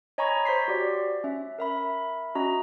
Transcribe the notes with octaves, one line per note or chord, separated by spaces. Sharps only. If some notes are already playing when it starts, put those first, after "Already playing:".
C#5 D#5 G#5 A#5 B5 C#6
C5 C6 B6 C7
F#4 G4 D5
C#4 E5
A#4 E5 B5
C#4 F#4 D#5 A#5